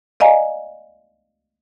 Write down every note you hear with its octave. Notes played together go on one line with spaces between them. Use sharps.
D5 D#5 F5 G#5 A#5